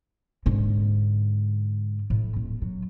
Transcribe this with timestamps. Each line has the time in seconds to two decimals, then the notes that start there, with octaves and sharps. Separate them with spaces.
0.46 G#2 D3
2.10 A2
2.36 D#1
2.62 F#3